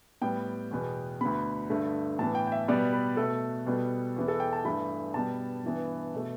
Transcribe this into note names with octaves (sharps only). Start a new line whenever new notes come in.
A2 G3 B3 G5
E2 B2 B3
D2 D3 B3 B5
G2 D3 A3
A2 E3 B3 A5
G5
G5
E5
B2 G3 B3 D5
B4
B2 A3 A4
B2 G3 B3
E2 E3 B3
A4
G5
A5
G2 E3 A3 B5
B2 G3 B3 A5
G2 E3 B3
B2 A3